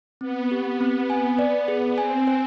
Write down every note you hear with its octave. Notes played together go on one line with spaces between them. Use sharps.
B3 C4
G4
C4
G#5
D5
G#4
C4 G#5
C5